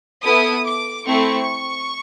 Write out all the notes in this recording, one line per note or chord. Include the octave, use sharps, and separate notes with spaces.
B3 E4 A4 D#6
D6
A3 C4 E4 C#6